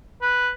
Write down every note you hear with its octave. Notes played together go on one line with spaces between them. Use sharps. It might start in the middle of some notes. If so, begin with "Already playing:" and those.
B4